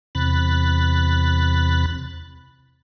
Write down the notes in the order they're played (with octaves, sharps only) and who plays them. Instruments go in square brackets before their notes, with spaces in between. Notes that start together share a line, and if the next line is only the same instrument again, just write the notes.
[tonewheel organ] E2 C3 B5 F#6 A6